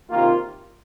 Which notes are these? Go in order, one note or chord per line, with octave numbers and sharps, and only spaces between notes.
C3 D#3 A#3 F4